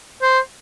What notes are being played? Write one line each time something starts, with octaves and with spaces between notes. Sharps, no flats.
C5